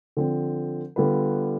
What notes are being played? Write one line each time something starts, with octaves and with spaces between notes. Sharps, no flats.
D3 F3 C4
D3 G3 B3 F4 B4